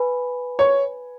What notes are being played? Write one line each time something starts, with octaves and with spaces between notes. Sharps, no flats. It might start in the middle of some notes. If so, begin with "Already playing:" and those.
Already playing: B4 G#5 B5
C#5